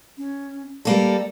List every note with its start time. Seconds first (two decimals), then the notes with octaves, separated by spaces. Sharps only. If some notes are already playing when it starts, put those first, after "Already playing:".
0.18 C#4
0.85 G3 A#3 A4 D5